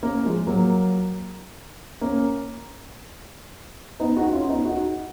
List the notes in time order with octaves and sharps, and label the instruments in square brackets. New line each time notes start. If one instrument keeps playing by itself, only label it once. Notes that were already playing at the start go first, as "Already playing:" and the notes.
[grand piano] A#3 C#4
F3 G#3
F#3 A#3
A#3 C#4
B3 D#4
D#4 F#4
C#4 F4
B3 D#4
D#4 F#4